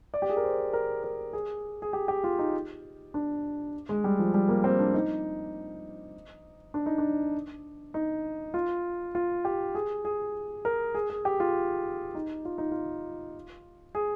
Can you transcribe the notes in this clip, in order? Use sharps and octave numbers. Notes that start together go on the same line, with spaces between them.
D5
G4
G#4
A#4
C5
A#4
A#4
G#4
G#4
G4
G4
F4
D#4
D4
G#3
G3
F3
G3
A#3
C4
D4
D#4
D4
D#4
D4
D#4
F4
F4
G4
G#4
G#4
A#4
G#4
G#4
G4
F4
D#4
F4
D#4
F4
G#4